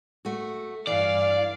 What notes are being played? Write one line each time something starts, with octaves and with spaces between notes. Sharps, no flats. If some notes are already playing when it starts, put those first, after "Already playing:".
A3 F#4
G2 E3 D5 F5